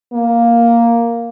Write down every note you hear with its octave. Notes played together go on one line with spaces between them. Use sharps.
A#3